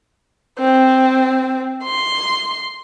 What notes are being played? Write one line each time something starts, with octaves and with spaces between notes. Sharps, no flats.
C4
C6